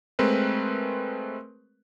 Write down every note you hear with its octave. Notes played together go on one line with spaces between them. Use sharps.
G#3 A3 C4 A#4 B4